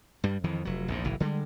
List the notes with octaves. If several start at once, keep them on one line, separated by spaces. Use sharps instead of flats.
G2 G3
F2 D#3 E3
F1 F#3
A#1 E2 G#2
F#1 B1 A2 E3
D3 G3 G#3